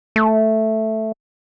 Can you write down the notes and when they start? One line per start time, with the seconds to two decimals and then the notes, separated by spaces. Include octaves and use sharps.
0.16 A3